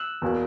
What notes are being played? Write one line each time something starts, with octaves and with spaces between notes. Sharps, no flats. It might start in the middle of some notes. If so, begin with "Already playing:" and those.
Already playing: E6 F#6
E2 B2 A#3